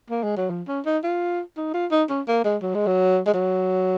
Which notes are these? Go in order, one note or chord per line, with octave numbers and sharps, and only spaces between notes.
A#3
G#3
F#3
F3
C#4
D#4
F4
D#4
F4
D#4
C#4
A#3
G#3
F#3
G#3
F#3
G#3
F#3